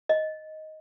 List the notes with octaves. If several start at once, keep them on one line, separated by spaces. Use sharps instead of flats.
D#5